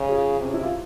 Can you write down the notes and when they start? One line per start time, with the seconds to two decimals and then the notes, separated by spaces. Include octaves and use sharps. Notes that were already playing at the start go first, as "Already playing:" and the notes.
Already playing: C#3
0.09 F4 G#4
0.41 C3 C#4
0.54 E4
0.63 F4